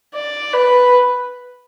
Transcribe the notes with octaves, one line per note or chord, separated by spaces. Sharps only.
D5
B4